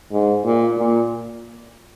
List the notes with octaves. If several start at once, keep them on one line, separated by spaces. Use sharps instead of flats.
G#2
A#2
A#2